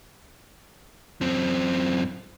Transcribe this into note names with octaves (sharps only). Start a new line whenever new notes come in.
F#2 C4